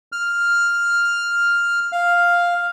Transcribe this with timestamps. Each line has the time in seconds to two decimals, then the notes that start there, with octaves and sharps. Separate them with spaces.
0.12 F6
1.92 F5